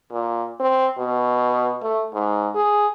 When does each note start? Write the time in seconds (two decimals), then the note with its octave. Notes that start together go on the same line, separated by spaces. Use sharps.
0.11 A#2
0.60 C4
0.98 B2
1.82 A3
2.13 G#2
2.55 G#4